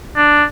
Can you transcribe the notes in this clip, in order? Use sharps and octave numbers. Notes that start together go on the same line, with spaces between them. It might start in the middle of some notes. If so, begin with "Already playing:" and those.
D4